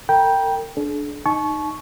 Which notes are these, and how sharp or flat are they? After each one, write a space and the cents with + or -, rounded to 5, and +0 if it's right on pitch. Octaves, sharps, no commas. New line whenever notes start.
A#4 -40 G5 +0 B5 -45
D4 +0 A4 -45
D#4 -15 A5 -40 C#6 +0